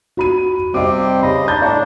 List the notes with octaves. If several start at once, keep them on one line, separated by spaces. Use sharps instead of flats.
F#4 B5 D#7
C3 G3 C4 D#5 D6
C#3 D#5 B5
D4 A#5 G6 A6
A2 D4 D5 C#6